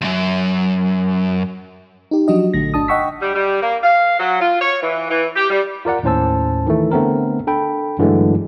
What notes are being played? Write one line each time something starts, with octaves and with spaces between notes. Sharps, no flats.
C#2 F#2
D#4 G4
F3 F#3 D4 F#4 D#5
A#1 D3 A3 A#6
G1 D4 A5 D#6
D#5 F#5 G5 C#6 E6 B6
G3
G3
A#3
F5
F#3
F4
C#5
E3
E3
G4
G3
F4 A#4 D5 F#5
D#2 A2 C#4 C5 A5 E6
D#3 E3 A3
D3 A3 B3 C4 A#4
D4 A4 G5 B5
G2 D3 E3 F#3 G#3 A3